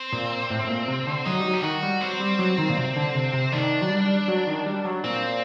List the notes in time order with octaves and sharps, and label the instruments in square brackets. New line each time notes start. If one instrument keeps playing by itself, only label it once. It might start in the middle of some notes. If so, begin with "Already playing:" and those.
Already playing: [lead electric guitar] C4
[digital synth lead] A#2
A2
A2
A#2
C3
D3
[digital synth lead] F#3 [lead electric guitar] D#4
[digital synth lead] G3
F#3
[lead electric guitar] G4
[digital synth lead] D#3 [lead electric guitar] F#4
[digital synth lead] G3
[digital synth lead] F#3 [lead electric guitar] C4
[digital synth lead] G3
F#3
D#3
A#2
C3
D3
C3
C3
[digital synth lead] D#3 [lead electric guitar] D4
[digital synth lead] F#3
G3
F#3
D#3
G3
F#3
[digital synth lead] A#2 [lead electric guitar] C4